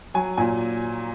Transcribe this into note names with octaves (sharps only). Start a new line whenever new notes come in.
F#3 G#5
A#2 G#5